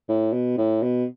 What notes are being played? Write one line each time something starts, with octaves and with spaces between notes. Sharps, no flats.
A2
B2
A2
B2